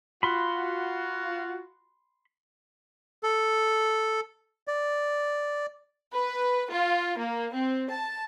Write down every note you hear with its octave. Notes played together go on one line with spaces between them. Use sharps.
F4 F#4 B5 C6
A4
D5
B4
F4
A#3
C4
A5